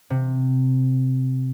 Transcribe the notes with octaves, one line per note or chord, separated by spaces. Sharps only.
C3